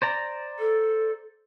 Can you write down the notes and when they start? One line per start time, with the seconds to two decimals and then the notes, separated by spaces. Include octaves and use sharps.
0.02 C5 D5 A#5
0.59 A4